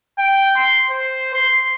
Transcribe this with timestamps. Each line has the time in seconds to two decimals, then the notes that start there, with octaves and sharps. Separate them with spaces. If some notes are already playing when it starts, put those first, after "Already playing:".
0.18 G5
0.57 C6
0.90 C5
1.34 C6